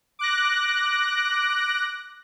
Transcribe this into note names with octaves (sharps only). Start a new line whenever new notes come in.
D6 F#6 A#6